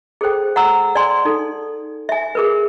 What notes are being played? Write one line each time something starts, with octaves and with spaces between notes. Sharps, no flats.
G#4 A4 C5 G5
F#5 A#5 E6
D5 G#5 C6
D#4 A4
E5 G#5
G#4 A#4 B4